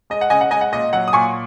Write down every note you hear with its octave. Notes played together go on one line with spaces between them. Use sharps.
G#3 D#5
F#5
C#3 D#5 G#5
F#5
G#3 D#5 G#5
F#5
A#2 D#5
F#3 F#5
D#6
A#2 G#5 C#6